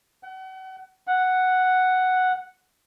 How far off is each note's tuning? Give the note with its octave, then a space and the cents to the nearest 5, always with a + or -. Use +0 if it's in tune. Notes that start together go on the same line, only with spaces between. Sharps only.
F#5 +35
F#5 +0